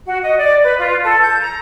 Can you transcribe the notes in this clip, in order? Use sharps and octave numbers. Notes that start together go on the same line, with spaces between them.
F#4
D#5
D5
B4
F4
A4
G6
A#5